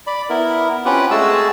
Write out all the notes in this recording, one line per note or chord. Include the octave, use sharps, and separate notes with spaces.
D5 B5
B3 E4 A#4
C4 C#4 F4 G4 B4 F#5
G#3 A3 F#4 G#4 A5 E6